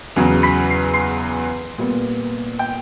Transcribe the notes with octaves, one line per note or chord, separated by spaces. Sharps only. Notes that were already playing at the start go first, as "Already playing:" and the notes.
E2 C#3 F#3
B5 B6
C7
C6 C7
A#2 G3 B3
G5 G6